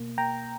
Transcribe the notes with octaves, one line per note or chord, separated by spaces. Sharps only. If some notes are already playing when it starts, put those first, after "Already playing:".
Already playing: B2 A#3
A#3 G5 A#5